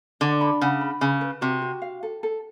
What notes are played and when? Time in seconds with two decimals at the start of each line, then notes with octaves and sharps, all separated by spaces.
0.21 D3 F#5
0.41 B5
0.61 C#3 F#5
0.81 B5
1.01 C#3 B4
1.21 B4
1.41 C3 F#4
1.62 F#4
1.82 F5
2.03 A4
2.23 A4